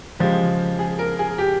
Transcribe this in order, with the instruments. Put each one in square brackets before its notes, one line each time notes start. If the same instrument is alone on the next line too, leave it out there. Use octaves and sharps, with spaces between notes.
[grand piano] C#3 F3 G#3 [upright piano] G4
[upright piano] G#4
A#4
G#4
G4